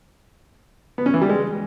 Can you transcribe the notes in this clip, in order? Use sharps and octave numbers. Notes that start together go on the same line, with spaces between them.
B3
C#4
E3
G3
G#3